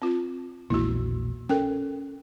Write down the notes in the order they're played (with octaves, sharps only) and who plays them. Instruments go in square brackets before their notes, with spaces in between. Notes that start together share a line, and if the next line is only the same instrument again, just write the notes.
[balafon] C4 F4
[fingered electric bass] E1 A#1 A#3 [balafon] E4 F#4
[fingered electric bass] C#4 [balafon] A4 A#4 G5